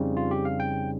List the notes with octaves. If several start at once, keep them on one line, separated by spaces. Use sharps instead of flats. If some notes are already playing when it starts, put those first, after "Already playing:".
Already playing: F2 C#3 G3 C4 D#4
F4
G4
F5
G5